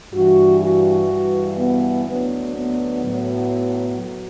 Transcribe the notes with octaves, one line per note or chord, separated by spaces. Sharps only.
G2 E3 F#4
F#4
G2 E3
B3
D2 D3 F#3 B3
B3
A2 F#3
F#3